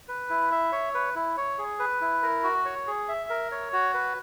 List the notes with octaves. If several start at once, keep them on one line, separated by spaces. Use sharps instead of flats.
B4
E4
E5
C#5
B4
E4
C#5
G#4
B4
E4
A#4
F#4
C#5
G#4
E5
A#4
C#5
F#4
B4